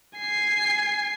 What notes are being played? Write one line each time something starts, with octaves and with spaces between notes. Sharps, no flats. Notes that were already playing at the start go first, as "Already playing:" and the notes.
G#5 C7